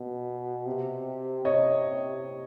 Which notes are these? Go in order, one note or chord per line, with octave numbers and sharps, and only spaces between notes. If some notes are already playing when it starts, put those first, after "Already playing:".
Already playing: B2
C3
C3 C#5 D#5